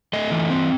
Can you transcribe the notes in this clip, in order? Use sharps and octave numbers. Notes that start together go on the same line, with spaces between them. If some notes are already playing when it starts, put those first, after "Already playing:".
A3 D#5
E3
C4